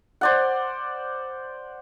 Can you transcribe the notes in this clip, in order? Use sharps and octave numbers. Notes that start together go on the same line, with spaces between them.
C5 D5 F#5